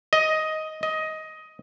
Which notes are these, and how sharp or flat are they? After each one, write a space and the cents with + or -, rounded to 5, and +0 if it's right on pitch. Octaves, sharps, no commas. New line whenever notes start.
D#5 +10
D#5 +15